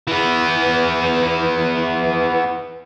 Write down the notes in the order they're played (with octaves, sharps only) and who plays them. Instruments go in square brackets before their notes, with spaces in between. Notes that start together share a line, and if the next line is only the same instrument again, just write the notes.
[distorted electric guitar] E3 B3